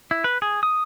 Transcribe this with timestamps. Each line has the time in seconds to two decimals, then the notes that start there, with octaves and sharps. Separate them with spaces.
0.11 E4
0.24 B4
0.42 G#4
0.63 D#6